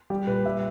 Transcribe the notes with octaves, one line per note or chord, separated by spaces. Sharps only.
G3 G4
A#2 B4
G3 E5